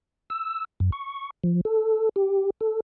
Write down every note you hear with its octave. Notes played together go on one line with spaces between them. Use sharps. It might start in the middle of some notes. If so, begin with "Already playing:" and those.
E6
F#2
C#6
F3
A4
G4
A4